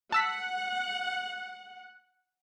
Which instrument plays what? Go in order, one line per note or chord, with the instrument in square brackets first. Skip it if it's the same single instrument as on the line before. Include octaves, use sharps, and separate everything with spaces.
[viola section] F#5 [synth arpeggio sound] A5 E6 B6